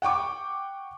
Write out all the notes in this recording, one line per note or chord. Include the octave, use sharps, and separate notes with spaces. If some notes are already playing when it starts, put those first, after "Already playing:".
F#5 G5 C#6 D6